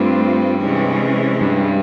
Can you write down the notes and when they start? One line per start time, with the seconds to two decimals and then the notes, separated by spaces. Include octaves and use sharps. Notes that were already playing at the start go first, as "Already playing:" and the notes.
Already playing: G2 A3 C4 F4
0.60 C3 E3 G#3 C#4
1.41 G2